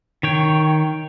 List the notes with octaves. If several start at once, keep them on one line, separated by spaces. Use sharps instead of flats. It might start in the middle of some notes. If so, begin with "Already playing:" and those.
D#3 C#5 G5